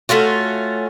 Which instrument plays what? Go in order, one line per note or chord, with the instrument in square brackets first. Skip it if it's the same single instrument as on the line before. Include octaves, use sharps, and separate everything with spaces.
[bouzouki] A3 C#4 F4 F#4